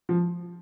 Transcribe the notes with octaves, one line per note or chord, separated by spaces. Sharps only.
F3